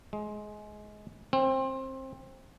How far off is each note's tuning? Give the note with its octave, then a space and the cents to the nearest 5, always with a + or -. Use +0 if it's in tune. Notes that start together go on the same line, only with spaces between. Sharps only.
G#3 +20
C4 +20